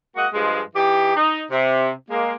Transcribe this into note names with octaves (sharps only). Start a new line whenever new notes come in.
G#3 A#3 F#4 D#5 F#5
G2 F3 G#3
E3 D#4 G4
D#4
C3
G#3 A#3